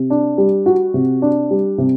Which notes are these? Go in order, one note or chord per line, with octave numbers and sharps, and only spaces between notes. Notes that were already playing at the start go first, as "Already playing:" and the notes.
Already playing: C3
D4
G3
F#4
C3
D4
G3
C3